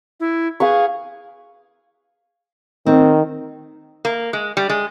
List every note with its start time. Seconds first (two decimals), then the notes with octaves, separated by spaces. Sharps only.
0.20 E4
0.60 G#4 B4 F5 C#6
2.86 D#3 C4
4.05 A#3
4.33 G#3
4.57 G3
4.69 G#3